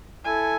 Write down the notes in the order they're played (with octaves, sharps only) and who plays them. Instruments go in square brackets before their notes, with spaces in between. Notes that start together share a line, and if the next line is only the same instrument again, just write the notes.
[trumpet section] E4 A4 [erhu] G#5